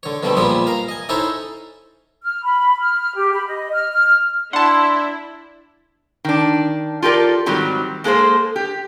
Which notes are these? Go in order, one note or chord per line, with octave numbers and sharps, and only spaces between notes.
D3 C#5
B2 D3 G3 A3 C4
A#2 F3 G3 G#3 B3 G#4
A#4 F5
D#5 G#5
C#4 D#4 E4 A4 C5 C#5
F6
B5
F6
G4
B5
D#5
F6
F6
D4 E4 F#5 A5 C6
D#3 D4
F4 G4 A4 A#4 D5
G#2 D#3 F#3 G3 C4
G#3 A#3 G#4 A4 C5
G4